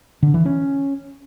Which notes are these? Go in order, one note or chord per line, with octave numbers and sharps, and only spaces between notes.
D3
E3
C#4